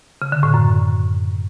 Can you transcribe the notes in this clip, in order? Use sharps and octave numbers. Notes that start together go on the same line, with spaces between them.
C#3
D3
A2
F#2